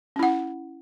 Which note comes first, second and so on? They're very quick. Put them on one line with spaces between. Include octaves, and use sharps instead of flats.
C#4 E4 F#5